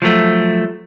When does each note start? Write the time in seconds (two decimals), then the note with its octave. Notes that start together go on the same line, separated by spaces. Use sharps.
0.02 F3 F#3 A3